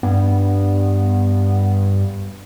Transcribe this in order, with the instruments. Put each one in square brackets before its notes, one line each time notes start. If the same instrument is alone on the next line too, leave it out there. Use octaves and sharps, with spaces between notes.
[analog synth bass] G2 [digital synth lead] B3